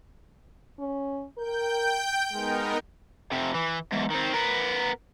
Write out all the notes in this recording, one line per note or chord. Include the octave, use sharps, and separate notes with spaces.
C#4
A#4 G5 G6
G#3 B3 D#4 A#4
F2 C3
E3
E2 G#2
D#3 C4
B3 A#4